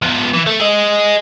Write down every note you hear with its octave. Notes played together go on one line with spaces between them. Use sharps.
F3 B3
E3
A3
G#4 D#5